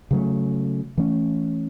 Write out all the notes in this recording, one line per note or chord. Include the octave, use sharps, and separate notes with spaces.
C#3 F#3 A3
E3 A3 C#4